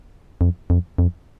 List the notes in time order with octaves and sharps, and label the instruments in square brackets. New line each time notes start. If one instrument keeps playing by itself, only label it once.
[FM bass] F2
F2
F2